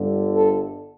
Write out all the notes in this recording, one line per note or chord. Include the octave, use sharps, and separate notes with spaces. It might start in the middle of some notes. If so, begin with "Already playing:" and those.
Already playing: G1 G2 D3
A4